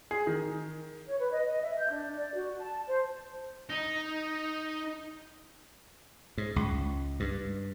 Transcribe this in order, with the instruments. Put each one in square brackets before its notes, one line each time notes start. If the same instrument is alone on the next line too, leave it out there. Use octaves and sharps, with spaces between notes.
[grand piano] G#4
D#3
[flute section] C#5
B4
D#5
D#5
E5
G6
D4
D5
F#4
A5
C5
[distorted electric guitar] D#4
[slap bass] G#2
C#2
G2